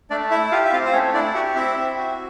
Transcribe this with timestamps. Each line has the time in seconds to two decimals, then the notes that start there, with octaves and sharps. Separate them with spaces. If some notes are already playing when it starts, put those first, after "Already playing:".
0.10 A3 D4 D5
0.31 E4 E5
0.52 F4 G4 F5
0.65 E5
0.72 C4 F4 F5
0.86 C5
0.93 A3 C#4 C#5
1.14 D4 E4 D5
1.34 F#4 G4 F#5
1.55 C4 E4 E5
1.77 C4
1.97 F#4